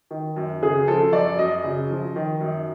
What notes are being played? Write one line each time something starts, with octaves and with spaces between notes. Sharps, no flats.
D#3
F#2
C#3 G#4
F3 A4
F#2 D5
F#2 D#5
C#3
F3
D#3
F#2